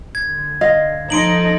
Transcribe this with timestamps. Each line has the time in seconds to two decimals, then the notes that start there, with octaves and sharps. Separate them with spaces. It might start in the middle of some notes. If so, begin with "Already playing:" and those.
0.15 D3 G#6
0.61 D#5 F5
1.10 F3 D#4 A4 C6 D7 F#7